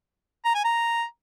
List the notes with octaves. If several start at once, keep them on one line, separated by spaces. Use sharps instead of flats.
A#5
G#5
A#5